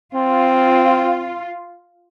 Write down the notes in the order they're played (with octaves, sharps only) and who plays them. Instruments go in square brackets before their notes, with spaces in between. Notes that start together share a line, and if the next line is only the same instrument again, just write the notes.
[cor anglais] C4 [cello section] F4